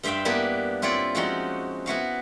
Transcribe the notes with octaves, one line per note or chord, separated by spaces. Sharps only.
G2 C5 E5 F5 G5 B5
A#3 B3 D4 E4 G4
C4 E4 F4 C#5 D5
F3 G#3 C4 C#4 D#4 F#4
B3 E4 F#4 F5